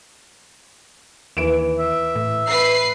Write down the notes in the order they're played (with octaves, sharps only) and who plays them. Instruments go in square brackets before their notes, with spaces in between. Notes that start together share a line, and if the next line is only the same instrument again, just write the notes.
[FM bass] D#2 [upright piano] E3 D7 E7
[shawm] E5
[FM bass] A2
[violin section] B4 C7